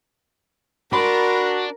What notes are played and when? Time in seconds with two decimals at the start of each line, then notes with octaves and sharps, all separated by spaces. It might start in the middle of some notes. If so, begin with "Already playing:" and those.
0.93 D4 F#4 A#4 B5 C6